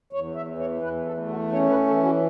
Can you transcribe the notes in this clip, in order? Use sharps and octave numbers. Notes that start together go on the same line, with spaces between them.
E2 C#5
E5
E3
C#5
E2 B4
A4
A3
F#4
C#4 C#5
B4
E3 A4
F#4